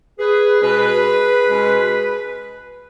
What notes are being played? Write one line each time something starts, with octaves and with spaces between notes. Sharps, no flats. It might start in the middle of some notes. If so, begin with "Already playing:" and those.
G#4 B4
B2 G#3 C#4 G#4 B4
B2 G#3 C#4